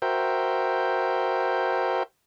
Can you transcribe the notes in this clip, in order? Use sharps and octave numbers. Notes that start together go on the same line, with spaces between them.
F#4 A#4 C5 E5 G5